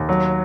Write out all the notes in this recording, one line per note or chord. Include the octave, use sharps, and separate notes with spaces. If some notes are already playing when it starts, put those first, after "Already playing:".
Already playing: D#2
F#3